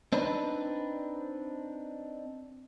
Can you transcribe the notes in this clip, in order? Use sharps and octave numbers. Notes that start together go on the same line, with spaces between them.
C4 D4 D#4 B4